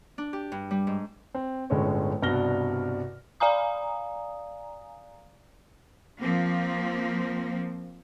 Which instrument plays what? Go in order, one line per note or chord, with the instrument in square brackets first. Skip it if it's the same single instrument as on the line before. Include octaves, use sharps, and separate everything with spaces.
[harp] D4
G4
G2
G3
G#2
[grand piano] C4
G1 A2 D3 G#3 C#4 C#5
C2 G2 B2 F6 A#6 G7
[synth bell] D5 F5 G#5 A#5 D#6
[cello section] F3 A#3 C4